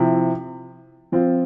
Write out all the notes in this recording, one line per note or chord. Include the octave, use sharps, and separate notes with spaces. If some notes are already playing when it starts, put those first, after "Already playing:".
Already playing: C3 F3 C4 E4
F3 C4 F4